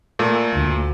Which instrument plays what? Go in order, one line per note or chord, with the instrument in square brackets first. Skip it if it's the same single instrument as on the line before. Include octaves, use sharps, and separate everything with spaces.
[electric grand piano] A#2 A3
[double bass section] D2